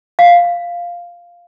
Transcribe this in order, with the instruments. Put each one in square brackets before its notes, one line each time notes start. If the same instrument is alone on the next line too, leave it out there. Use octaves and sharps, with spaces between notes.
[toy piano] F5